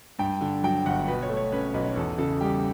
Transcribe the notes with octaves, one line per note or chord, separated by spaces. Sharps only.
G2 G5
D3
F#3 G5
G1 F#5
B2 B4
C#5
A3
C#5
C#4 B4
B1 B4
E2 A4
C#3 A4
G3 G4